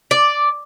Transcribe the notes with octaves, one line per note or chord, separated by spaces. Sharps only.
D5